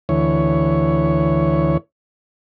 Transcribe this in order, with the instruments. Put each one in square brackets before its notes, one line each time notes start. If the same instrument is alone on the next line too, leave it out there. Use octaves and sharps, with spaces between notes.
[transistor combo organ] D2 E3 C#5